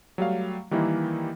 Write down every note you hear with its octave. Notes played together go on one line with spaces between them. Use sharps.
F#3 G3 A3 F5
D#3 E3 G3 A#3 D#4 E4